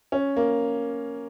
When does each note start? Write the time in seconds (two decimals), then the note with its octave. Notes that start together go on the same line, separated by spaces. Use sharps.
0.12 C#4
0.36 A#3